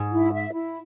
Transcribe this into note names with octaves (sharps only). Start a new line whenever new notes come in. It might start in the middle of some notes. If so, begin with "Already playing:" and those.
Already playing: G#2
E4
E5
E4